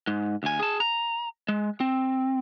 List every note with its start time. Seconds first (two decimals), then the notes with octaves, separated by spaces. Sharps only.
0.07 G#2
0.43 D2 G#5
0.60 G#4 A5
0.80 A#5
1.48 G#3
1.80 C4